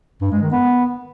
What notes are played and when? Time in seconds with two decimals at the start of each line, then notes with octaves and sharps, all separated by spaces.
0.22 G2
0.32 G#3
0.42 D#3
0.52 B3